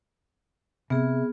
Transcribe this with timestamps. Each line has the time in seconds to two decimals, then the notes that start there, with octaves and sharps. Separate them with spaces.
0.90 C3 B3 G#4